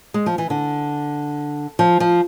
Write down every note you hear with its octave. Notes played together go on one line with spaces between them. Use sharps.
G#3
F3
E3
D3
F3
F3